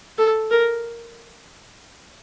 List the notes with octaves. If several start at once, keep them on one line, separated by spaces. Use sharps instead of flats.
A4
A#4